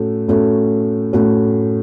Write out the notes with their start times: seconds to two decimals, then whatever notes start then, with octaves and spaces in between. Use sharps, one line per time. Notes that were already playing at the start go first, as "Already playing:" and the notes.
Already playing: A2 A3 C#4 F#4
0.28 A2 A3 C#4 F#4
1.13 A2 A3 C#4 F#4